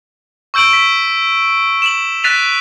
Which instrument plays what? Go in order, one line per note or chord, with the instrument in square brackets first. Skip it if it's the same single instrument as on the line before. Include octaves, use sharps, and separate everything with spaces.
[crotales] C#6 E6 G6 D7 F#7
B6
E7 F#7
F#6 A6 B6 D#7 F7